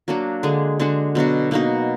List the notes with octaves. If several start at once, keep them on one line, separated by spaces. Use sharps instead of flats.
F#3 A#3 D4 F#4
D3 G#3 D4 G#4
D3 G#3 D4 F#4
B2 F#3 D4 F#4
B2 A#3 D#4 F#4